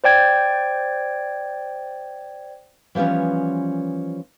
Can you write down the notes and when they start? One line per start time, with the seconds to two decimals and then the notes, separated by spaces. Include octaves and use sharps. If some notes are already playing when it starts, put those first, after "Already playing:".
0.04 C5 D5 G5 G#6
2.95 E3 F3 G3 B3 C#4